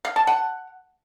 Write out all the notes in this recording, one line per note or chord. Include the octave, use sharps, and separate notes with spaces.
F5
A5
F#5